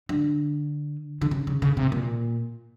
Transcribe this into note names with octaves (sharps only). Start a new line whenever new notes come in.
D3
D3
C#3
C#3
C#3
C3
A#2